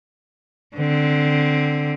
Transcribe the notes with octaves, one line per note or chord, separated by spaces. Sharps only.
D3 C4